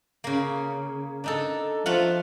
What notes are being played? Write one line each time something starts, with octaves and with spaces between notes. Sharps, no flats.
C#3 A#3
D4 D#4 A4
F3 A3 F4 F#5